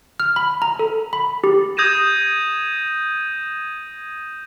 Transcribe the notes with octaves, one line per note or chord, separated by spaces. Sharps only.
F6
B5
A#5
A4
B5
G4
D#6 G6 G#6 A#6 D#7 E7